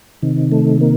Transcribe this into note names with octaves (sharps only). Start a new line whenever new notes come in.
C3 D#3
A3
A#3